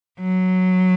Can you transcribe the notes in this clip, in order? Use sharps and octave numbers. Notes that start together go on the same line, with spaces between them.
F#3